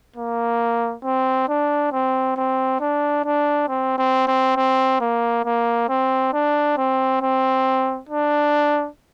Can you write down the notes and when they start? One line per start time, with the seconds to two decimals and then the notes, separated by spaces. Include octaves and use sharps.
0.16 A#3
1.04 C4
1.49 D4
1.92 C4
2.37 C4
2.80 D4
3.25 D4
3.68 C4
3.98 C4
4.28 C4
4.56 C4
5.01 A#3
5.45 A#3
5.89 C4
6.33 D4
6.77 C4
7.21 C4
8.09 D4